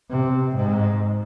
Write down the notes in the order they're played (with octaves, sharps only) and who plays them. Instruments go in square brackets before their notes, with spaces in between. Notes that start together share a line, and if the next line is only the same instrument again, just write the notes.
[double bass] C3
G#2